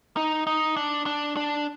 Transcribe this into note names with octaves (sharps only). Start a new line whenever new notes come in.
D#4
D#4
D4
D4
D4